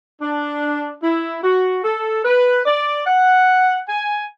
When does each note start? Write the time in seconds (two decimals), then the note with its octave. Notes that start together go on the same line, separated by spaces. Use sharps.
0.22 D4
1.03 E4
1.43 F#4
1.84 A4
2.25 B4
2.66 D5
3.07 F#5
3.88 G#5